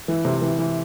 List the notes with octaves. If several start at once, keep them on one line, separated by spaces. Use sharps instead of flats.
E3
C3
E3
E3